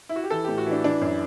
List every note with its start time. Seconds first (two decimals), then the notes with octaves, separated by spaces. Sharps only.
0.09 E4
0.16 F#4
0.24 G4
0.30 E3 A4
0.44 A2 G4
0.58 F#4
0.66 E3
0.72 D4
0.84 E3 D4
1.01 F#2